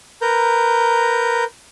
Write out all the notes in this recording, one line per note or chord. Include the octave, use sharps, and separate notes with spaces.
A#4 B4 A#5 G6